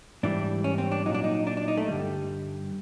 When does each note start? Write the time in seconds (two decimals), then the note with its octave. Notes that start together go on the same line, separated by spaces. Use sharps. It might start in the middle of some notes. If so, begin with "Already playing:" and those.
0.23 G#2 E3 G3 D4
0.64 C#4
0.78 C4
0.92 D4
1.06 F#3 D#4
1.09 A#2
1.14 D4
1.24 D#4
1.47 D4
1.57 D4
1.68 D#4
1.77 A3
1.88 G2 D3 G3